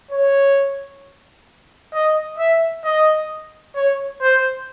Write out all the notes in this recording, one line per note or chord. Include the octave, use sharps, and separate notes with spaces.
C#5
D#5
E5
D#5
C#5
C5